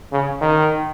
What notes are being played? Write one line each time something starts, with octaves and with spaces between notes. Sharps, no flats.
C#3
D#3